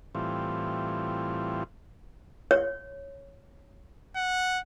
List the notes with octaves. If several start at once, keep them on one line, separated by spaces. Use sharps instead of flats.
A2 E3 G3 C4 F4
C#5
F#5